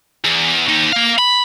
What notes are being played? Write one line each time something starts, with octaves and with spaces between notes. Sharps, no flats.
E2
D#2 D#4
A#3 F5
B5